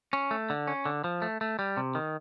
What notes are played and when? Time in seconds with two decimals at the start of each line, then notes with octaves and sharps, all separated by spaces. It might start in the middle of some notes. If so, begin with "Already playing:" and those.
0.13 C#4
0.31 A3
0.50 D3
0.67 C#4
0.85 D3
1.04 F3
1.22 A3
1.41 A3
1.59 G3
1.77 C3
1.95 D#3